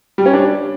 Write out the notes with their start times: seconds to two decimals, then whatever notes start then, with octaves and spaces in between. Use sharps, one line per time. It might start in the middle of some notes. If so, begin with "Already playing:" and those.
0.18 G3
0.26 C#4
0.33 D4